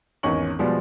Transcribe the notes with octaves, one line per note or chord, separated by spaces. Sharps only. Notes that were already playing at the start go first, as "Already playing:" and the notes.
G#1 E2 C#4 D#5 C#6 F#7
B2 F3 G3 G#3 B3